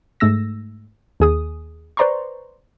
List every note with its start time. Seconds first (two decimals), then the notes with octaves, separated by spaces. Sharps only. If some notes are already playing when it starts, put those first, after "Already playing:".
0.20 G#2 A3 E6 A#6
1.20 D#2 G#4 D#6
1.97 B4 C5 D5 A#5 C6 C#6